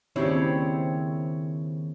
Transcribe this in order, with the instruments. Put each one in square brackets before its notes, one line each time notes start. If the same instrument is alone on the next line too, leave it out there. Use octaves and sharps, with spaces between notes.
[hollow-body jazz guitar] D#2 C#3 D4 [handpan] C4 C#5 [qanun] E4 G4